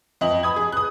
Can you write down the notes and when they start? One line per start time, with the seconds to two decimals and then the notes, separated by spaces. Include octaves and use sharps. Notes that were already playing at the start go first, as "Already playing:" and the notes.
0.21 F2 D#5 F#7
0.43 B5 D#6 G#6
0.56 G#4
0.72 D#6 F#6